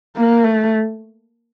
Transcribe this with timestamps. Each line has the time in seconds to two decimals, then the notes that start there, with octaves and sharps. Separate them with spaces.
0.16 A#3
0.44 A3